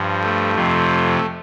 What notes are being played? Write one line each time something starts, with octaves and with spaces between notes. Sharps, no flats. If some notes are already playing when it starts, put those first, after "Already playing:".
Already playing: G2 F3
A3
F2 C3 F3